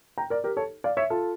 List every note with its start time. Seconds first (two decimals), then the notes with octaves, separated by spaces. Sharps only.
0.18 G5 A#5
0.30 A#4 D5
0.44 G4 A#4
0.57 A4 C#5
0.84 D5 F5
0.97 C#5 E5
1.10 F4 A4